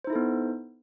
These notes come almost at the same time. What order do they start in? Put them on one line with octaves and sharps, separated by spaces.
C5 D#4 E4 A4 B3